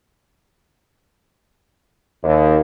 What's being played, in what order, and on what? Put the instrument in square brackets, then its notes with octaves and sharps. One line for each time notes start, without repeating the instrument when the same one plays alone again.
[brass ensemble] D#2